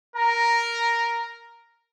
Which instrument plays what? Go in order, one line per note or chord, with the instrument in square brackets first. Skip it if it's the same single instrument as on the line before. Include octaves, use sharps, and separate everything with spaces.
[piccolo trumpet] A#4 [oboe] A#5